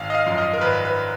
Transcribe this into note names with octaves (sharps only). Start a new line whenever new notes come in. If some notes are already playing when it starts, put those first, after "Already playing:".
Already playing: G#1 F5
D#5
F5
F#2 F3
D#5
A#4
G#1 B4
B4